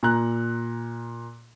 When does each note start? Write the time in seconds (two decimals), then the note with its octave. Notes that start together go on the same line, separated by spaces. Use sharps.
0.03 A#2 A#5 F#6